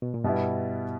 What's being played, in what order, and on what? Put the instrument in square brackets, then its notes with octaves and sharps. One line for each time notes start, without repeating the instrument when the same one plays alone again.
[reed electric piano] B2
A#2
[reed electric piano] G2 [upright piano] B2 G3 B3 E4